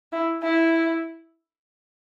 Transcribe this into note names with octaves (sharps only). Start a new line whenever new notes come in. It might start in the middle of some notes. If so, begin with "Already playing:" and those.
E4
E4